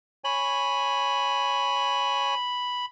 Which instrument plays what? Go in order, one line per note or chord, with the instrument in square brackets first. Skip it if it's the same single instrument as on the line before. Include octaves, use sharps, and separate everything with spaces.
[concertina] C#5 G#5 [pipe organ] B5